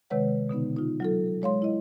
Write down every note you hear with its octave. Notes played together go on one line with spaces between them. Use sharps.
C3 D#3 G#3 B4 C#5 F#5
B2 D3 B3 D#4
D#4 F4
F#3 F4 A4
G#3 C#5 F5 C6
E4 D#5